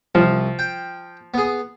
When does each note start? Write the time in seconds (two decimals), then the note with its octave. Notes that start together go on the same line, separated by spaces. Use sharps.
0.15 C2 F3
0.59 G5
1.34 B3 G#4